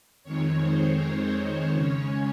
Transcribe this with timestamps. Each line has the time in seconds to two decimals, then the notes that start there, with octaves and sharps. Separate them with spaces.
0.24 F2 D#3 G#3 C4 C#5
0.62 C5
0.98 C#5
1.35 C5
1.72 C#3 G#3 C#4 C#5